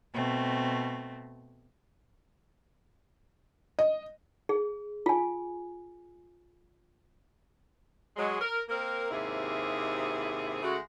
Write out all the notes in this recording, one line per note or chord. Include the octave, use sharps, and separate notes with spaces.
B2 A3 C4
D#5
G#4
F4 G#5
F#3 G#3
A#4
A#3 C4 A#4
D#2 G#2 C3 E4 G#4
C#3 G#3 A3 F#4